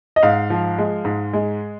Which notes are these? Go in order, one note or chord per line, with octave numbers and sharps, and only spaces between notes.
D#5
G#2 F5
F3
G#3
G#2
G#3